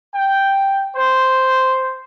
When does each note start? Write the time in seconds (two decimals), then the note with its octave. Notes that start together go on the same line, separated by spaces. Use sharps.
0.14 G5
0.95 C5